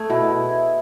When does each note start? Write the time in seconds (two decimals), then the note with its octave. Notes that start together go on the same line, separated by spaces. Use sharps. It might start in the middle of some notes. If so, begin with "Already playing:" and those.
Already playing: A3 G#4
0.10 B2 E4